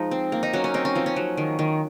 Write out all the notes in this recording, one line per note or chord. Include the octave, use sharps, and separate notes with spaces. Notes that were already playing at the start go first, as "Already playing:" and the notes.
Already playing: F3 G#3 D#4
C4
A#3
D#4
F#3 C#4
C#4
C4 D#4
C#4
F3 C4
C#4
F#3
D#3
D#3